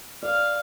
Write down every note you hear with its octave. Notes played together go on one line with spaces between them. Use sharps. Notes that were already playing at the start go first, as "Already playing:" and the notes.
D5 F5